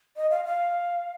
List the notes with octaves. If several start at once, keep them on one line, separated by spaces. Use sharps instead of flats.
D#5
F5
F5